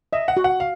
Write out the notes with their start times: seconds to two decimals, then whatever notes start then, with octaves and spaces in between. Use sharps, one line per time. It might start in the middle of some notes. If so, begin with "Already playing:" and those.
0.13 D#5 E5
0.28 F#5
0.37 F#4
0.44 F#5
0.60 F5